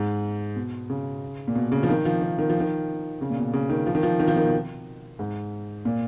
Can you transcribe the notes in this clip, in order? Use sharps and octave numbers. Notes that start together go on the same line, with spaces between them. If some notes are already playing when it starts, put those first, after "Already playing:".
Already playing: G#2
B2
C#3
A#2
B2
C#3
F3
D#3
F3
D#3
D#3
F3
D#3
C#3
A#2
B2
C#3
D#3
F3
D#3
F3
D#3
F3
D#3
B2
G#2
A#2